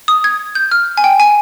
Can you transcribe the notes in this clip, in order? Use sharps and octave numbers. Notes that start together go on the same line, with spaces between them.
D#6
G#6
G6
F6
G#5
G5
G#5